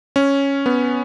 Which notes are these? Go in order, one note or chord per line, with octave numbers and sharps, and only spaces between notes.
C#4
B3